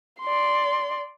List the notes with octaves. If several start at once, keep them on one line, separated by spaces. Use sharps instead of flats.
D5 C6